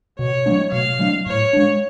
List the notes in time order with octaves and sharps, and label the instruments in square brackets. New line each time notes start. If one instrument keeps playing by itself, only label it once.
[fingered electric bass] B2 [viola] C#5
[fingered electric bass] F#3 A3 D4
[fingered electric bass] B2 [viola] F5
[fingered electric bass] F#3 A3 D4
[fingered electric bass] A2 [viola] C#5
[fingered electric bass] G#3 D4